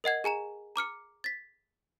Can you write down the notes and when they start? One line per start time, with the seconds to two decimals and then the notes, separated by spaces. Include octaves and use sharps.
0.04 A#4 D#5 F#5 G#6
0.24 G#4 G#5 A#5 E7
0.76 A#5 D6 F6 C#7
1.24 A6 B6